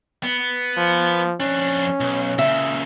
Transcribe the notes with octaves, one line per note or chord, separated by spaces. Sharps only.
B3
F3
F2 C#4 D4
B1
A#2 C#3 E5